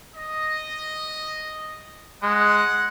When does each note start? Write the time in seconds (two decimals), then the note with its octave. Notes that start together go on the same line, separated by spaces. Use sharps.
0.15 D#5
2.23 G#3 F#5